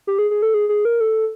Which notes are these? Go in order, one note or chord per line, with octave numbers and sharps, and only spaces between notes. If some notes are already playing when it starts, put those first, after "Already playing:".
G4
G#4
G#4
A4
G#4
G#4
A#4
A4